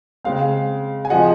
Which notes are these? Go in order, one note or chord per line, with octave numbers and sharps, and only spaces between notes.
C#3 G#3 C4 F5
G#5
C3 F3 G#3 D#5 F#5